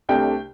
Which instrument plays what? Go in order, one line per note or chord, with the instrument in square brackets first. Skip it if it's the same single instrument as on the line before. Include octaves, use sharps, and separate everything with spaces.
[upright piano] C2 C3 A3 D4 G5